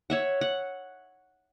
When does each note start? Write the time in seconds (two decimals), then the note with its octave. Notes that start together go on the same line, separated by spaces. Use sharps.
0.10 C#5 E5 F#5
0.41 F#5